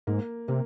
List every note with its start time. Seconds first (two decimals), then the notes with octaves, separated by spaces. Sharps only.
0.07 G#2 A#3
0.48 C3 A#3